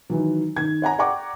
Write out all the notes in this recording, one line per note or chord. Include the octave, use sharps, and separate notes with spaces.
D#3 E3 F#3
D#3 G#6
C#5 F#5 G#5 A#5
D5 F#5 G5 A#5 C#6 D6